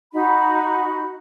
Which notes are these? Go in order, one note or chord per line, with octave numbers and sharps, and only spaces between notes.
D#4 F#4 B5